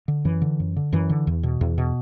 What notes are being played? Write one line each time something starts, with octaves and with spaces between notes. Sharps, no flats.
D3
F#2 E3
D3
F#2
D3
F#2 E3
D3
E2
B2
E2
B2